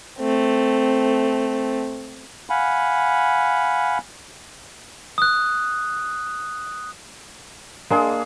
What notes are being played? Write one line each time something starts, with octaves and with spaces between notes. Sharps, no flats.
A3 C4
F5 F#5 G#5 B5
D#6 F#6
G#3 A#3 D4 G#4